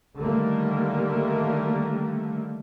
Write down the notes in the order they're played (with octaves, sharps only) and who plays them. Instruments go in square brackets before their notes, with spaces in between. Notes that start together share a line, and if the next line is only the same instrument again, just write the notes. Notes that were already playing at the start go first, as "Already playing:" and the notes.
[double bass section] D3 D#3 G3 A3 A#3